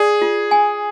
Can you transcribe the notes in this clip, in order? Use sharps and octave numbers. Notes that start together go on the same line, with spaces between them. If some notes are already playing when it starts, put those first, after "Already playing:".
Already playing: G#4 D5
F4
G#5